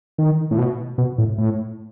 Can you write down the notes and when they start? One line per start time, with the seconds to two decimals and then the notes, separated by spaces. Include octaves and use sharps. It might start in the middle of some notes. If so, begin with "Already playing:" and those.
0.18 D#3
0.51 A2
0.58 B2
0.98 B2
1.18 A2
1.38 A2